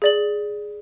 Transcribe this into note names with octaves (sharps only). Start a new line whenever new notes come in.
G#4 D5 F#7